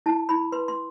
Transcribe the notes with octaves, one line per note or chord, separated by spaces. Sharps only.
E4 A5
E4 B5
B4 C6
C6